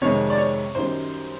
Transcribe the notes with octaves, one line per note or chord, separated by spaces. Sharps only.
F2 C3 D#3 G#3 C#5
D5
C#5
F#2 D#3 G3 C5